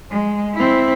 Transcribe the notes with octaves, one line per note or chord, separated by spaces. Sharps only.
G#3
C4 E4